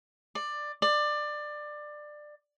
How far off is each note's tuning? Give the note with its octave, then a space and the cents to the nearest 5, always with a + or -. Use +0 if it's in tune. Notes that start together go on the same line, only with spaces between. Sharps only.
D5 +15
D5 +20